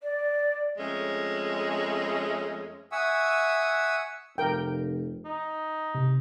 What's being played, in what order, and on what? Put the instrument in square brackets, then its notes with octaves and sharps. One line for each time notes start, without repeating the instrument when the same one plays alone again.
[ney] D5
[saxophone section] F2 G#3 A3 C#4
[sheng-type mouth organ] E5 F#5 G#5 C#6 D#6 E6
[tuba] F1 [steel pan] A#4 G5
[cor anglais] D#4
[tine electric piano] C3